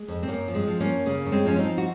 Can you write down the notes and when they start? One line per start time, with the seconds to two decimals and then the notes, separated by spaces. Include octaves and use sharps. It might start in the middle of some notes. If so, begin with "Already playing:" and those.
Already playing: G#3
0.08 F2
0.23 C4
0.28 F#2 A#3
0.48 F3
0.55 G#3 C4
0.67 F3
0.80 A#3 C#4
0.87 F#2
1.06 C#3 A#3
1.25 F#2
1.32 G#3 C4
1.45 F3 C#4
1.58 C4 D#4
1.65 F3
1.78 F#4